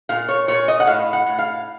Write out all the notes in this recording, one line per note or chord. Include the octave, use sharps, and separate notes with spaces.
A#2 F5
C#5
A#2 C#5
D#5
F#5
A2 F5
F#5
A2
F5